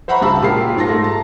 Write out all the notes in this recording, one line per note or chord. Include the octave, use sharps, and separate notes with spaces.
C5 E5 F#5 A#5 B5 C#6
C#2 G2 F#4 A5 B5 E6
A#2 F4 G4 G#4 A#4 C7
G#2 F4 A5 C6 A#6
A3
A5 A#5